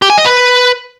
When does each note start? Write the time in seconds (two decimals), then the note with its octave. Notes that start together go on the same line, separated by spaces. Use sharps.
0.02 G4
0.10 G#5
0.18 D#5
0.26 B4